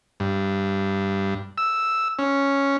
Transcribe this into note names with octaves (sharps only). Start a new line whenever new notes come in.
G2
E6
C#4